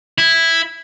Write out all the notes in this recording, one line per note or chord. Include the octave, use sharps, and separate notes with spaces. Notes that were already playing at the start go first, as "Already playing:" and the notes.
E4